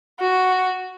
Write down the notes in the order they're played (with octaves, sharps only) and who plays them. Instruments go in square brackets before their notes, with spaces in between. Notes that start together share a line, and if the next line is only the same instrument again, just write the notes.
[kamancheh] F#4